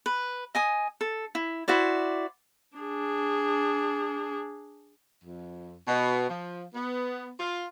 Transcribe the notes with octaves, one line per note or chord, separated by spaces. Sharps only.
B4
D#5 G#5 D#6
A4
E4
E4 F#4 C5 D5
D4 G#4
F2
B2
F3
B3
F4